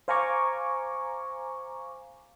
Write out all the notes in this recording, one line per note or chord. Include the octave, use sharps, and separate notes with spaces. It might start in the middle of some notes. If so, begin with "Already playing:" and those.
C5 F5 G#5 A#5 C#6 D6